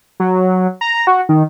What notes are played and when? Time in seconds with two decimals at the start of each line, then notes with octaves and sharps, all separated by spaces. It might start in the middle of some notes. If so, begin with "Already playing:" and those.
0.20 F#3
0.81 A#5
1.07 F#4
1.29 D#3